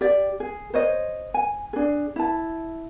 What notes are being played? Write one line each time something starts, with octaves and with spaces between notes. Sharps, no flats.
G4 D5
G#4
C5 C#5 D#5
G#5
D4 G#4
E4 A5